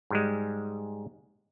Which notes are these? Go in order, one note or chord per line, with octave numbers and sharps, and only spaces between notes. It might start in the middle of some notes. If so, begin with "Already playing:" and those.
G#2 G3 G#3